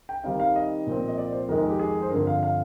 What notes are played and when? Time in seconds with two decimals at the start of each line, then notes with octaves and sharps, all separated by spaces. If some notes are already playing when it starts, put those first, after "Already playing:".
0.09 G5
0.24 D#3 G3 C4 D#4 F5
0.40 F5
0.56 D#5
0.87 A#2 F3 C4
1.08 D#5
1.18 D5
1.33 C5
1.48 F2 D#3 G#3 D#4 A#4
1.59 G#4
1.69 G4
1.79 G#4
2.02 C5
2.10 G2 D3 F3 C4 A#4
2.27 F5
2.43 F5